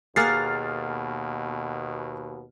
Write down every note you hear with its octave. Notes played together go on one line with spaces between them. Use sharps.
D#2 B2 A#3 G#4 F#5 F6 A6 C7